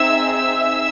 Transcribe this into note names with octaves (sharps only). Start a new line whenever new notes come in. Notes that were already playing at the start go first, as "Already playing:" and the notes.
Already playing: C4 D#4 G#4 E5 E6
E5 E6